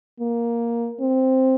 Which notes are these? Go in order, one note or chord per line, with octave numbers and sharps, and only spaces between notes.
A#3
C4